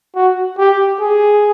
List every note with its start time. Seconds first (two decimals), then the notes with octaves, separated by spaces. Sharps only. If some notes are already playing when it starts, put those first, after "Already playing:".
0.15 F#4
0.58 G4
1.01 G#4